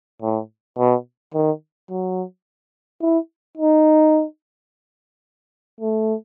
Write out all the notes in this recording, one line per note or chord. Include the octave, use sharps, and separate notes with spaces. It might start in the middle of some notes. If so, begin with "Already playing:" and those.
A2
B2
D#3
F#3
E4
D#4
A3